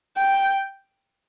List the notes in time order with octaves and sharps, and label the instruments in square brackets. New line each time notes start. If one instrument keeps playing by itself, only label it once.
[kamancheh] G5